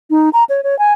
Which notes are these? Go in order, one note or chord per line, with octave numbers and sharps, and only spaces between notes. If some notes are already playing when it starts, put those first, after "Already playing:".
D#4
A#5
C#5
C#5
G#5